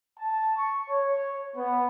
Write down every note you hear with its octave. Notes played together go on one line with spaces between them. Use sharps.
A5
C#6
C#5
B3